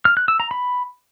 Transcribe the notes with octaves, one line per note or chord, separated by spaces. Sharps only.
F6
F#6
E6
A#5
B5